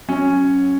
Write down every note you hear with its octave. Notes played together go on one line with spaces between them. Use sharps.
F#3 C#4